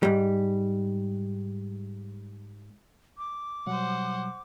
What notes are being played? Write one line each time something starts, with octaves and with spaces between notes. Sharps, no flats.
G#2 G3
D6
B2 F#3 G3 C5 F#5